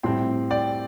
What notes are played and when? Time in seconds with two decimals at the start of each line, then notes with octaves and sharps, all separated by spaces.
0.03 A2 G3 C4 G5 C6
0.50 D5 G5